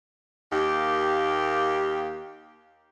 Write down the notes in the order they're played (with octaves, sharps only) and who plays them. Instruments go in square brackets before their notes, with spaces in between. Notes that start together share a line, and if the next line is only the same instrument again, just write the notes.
[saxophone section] D#2 A#3 G4